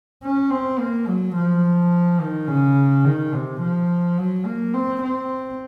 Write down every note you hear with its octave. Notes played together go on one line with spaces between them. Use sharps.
C#4
C4
A#3
F#3
F3
D#3
C#3
D#3
C3
F3
F#3
A#3
C4
C4